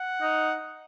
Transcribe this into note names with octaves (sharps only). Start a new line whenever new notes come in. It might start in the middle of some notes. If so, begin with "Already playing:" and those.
Already playing: F#5
D#4